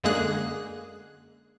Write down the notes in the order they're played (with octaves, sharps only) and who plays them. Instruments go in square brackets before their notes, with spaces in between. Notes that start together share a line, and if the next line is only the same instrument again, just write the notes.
[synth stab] F#2 D3 G#3 A#3 G#4 F#6